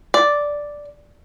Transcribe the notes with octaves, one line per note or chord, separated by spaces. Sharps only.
D5